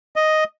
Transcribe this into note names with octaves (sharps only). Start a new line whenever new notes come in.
D#5